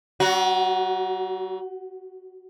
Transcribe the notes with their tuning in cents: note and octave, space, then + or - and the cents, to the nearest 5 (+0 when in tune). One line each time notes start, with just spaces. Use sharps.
F#3 +45 F#4 +0